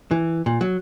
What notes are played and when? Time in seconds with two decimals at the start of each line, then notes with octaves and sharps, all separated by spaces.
0.11 E3
0.46 A#2
0.61 F#3